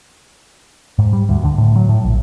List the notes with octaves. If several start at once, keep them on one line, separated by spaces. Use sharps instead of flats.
G#2
G3
D2
D3
A2
F#3
A2
A#1